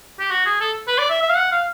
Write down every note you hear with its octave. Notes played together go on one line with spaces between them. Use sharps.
G4
F#4
G#4
A4
B4
D5
E5
E5
F5
F#5
F5